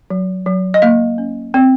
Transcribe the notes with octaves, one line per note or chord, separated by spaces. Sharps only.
F#3
F#3
D#5
A#3 F5
C#4
C4